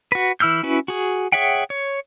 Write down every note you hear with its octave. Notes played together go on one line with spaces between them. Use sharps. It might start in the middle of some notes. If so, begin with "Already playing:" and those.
F#4 B4
E3 E4 E6 F6 G6
C#4 E4 F#4 B4
F#4 G#4
G#4 C#5 E5 F#5 G5
C#5